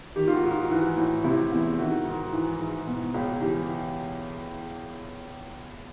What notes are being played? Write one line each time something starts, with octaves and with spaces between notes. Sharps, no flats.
D#3 G4
F4
F#4
G#2
F4
E3 F#4
A2
C3 E4
E2
D#3 F#4
G#2
E3
G#2
B2
C#2
E3 G4